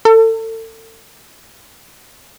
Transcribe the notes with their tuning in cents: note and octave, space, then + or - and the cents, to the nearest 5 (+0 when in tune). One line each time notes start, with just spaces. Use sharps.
A4 +35